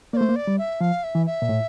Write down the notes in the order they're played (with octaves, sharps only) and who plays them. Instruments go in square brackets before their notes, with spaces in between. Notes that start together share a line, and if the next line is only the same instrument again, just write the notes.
[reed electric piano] A#3 [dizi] D5
[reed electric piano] A3 [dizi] C5
[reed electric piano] A#3
[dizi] D5
[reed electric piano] G3
[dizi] E5
[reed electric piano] F3 [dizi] F5
[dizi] E5
[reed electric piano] E3
[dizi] E5
[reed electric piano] A#2
A2